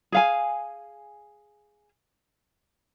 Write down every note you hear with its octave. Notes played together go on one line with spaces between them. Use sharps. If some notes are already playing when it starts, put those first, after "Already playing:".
G#4 F5 G#5